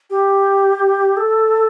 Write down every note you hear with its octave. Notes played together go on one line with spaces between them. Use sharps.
G4
A4